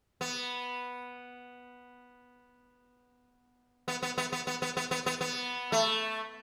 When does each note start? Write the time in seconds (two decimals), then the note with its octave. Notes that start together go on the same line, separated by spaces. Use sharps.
0.21 B3
3.88 B3
4.03 B3
4.18 B3
4.33 B3
4.47 B3
4.62 B3
4.77 B3
4.91 B3
5.06 B3
5.21 B3
5.72 A3